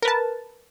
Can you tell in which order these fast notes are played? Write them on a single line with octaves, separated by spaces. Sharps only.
A#4 B4 A5